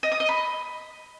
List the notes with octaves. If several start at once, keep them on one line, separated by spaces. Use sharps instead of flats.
D#5
D#6
D#5
B5